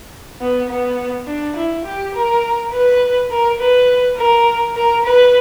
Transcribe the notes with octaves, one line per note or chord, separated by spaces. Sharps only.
B3
B3
D4
E4
G4
A#4
B4
A#4
B4
A#4
A#4
B4